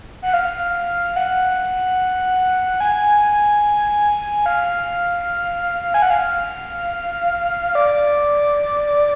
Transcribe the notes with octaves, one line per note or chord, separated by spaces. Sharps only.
F#5
F5
F#5
G#5
F5
G#5
F#5
F5
D5